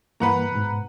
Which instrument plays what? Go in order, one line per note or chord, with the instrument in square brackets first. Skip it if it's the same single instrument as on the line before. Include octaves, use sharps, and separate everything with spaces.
[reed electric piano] G2 E3 A#3 [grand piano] B4 F#5 A#5
[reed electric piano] G#2 B2